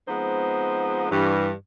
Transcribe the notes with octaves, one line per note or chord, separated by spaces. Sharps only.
F3 G#3 B3 C4 D#4 C5
G2 E3